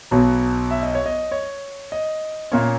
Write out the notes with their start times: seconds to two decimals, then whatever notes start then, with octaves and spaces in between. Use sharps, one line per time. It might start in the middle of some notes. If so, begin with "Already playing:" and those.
0.11 B1 B2 F#3 B3
0.71 E5
0.83 D#5
0.95 C#5
1.06 D#5
1.32 C#5
1.92 D#5
2.51 A#2 A#3 C#4 C#5